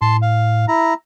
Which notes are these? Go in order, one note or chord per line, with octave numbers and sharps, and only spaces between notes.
A2 A5 C6
F5
E4 A#5